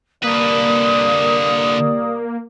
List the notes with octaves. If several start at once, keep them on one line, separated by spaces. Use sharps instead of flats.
C2 D3 A#3 G4 B4 D5 D#6